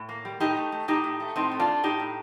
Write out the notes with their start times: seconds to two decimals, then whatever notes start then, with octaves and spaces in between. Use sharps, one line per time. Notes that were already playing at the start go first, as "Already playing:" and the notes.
Already playing: A2
0.09 A#3
0.25 G3
0.40 A2 D#4 G4
0.57 A3
0.72 A3
0.88 A2 D#4 G4
1.04 A2
1.20 A3
1.36 A2 C4 D#4
1.52 A3
1.60 D4 F4
1.68 A3
1.83 A2 D#4 G4
2.00 A2